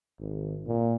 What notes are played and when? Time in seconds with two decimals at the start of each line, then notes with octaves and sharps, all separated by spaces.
0.20 G#1
0.67 A#2